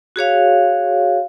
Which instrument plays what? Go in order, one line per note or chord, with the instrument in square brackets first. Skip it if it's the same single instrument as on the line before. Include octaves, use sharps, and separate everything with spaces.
[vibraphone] F#4 G#4 C#5 F5